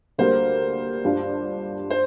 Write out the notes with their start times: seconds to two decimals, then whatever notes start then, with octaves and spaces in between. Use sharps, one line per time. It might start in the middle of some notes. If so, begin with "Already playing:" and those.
0.18 D2 D3 G3 A#3 C5
1.05 G2 G3 D4 F4
1.91 C5